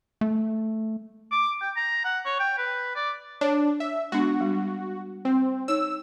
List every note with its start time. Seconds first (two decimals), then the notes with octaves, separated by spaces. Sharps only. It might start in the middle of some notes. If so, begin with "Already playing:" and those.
0.21 A3
1.32 D6
1.61 G5
1.77 A#5
2.05 F#5
2.26 C#5
2.40 G5
2.58 B4
2.96 D5
3.41 D4 C#5
3.80 E5
4.12 G#3 B3 D4 F#4
4.41 G3
5.25 C4
5.68 D#4 C#5 E6